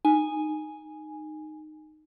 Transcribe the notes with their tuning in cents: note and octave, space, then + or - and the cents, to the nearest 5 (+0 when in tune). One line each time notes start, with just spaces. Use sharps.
D#4 -15 G#5 +0